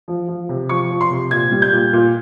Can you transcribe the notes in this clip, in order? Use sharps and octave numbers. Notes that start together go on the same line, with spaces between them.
F3
F3
C3
F3 C#6
F3
C6
C3
A#2 G#6
G3
G6
A#2
A#2